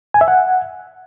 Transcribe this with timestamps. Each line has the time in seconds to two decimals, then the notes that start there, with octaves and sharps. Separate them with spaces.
0.14 G#5
0.21 E5
0.28 F#5